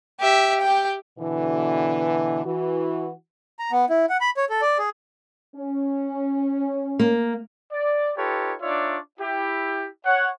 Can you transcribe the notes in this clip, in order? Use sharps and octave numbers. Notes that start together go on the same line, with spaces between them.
G4 E5
G4 G5
B2 D3 E3
E3 F#4
A#5
B3
E4
F#5
B5
C#5
A4
D5
G#4
C#4
A#3
D5
D#4 F4 G4 A4 B4 C#5
D4 D#4 F4 C#5 D5 E5
E4 G4
C#5 F#5